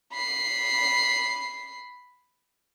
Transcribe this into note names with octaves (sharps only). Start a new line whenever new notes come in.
B5 C7